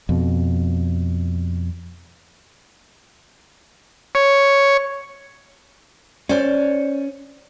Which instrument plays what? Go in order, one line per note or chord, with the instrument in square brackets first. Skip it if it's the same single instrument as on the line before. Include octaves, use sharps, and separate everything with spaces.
[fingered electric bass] F2 B2
[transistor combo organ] C#5
[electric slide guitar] C#4 [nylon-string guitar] C5 D5